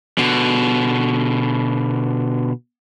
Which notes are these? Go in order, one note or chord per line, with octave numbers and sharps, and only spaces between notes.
B2 D3